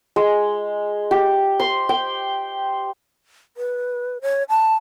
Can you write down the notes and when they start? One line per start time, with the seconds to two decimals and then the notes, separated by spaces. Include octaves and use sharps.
0.16 G#3
1.11 G4
1.60 C6
1.89 G5
3.57 B4
4.22 C#5
4.49 A5